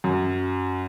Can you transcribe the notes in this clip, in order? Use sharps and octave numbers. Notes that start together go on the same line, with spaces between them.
F#2